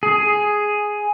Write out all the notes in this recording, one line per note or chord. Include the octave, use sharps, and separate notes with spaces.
G#4